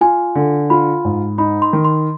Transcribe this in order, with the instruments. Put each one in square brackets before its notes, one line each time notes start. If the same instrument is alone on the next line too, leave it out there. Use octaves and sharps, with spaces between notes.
[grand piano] F4 [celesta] G#5
[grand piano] D3
[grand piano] F4 [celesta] B5
[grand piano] G#2
[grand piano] D#4 [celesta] B5
[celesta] C6
[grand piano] D#3
[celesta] C6